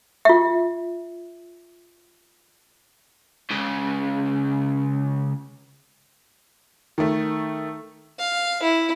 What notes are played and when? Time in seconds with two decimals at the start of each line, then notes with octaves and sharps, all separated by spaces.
0.25 F4 E5
3.50 C#2 C#3
6.98 D#3 A3
8.19 F5
8.63 E4